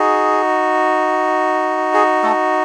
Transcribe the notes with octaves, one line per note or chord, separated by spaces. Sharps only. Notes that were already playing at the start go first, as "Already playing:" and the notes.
Already playing: D#4 F#4 G#4
G#4
A3 A4